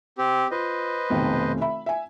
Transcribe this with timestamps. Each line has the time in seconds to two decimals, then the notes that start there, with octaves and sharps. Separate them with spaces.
0.18 C4 G4
0.51 F4 B4 C5 D#5
1.10 F1 B1 D#3
1.61 E5 B5
1.86 E5 G#5